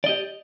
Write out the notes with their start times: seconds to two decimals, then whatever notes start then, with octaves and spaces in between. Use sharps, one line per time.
0.04 D5
0.06 D#5
0.09 G4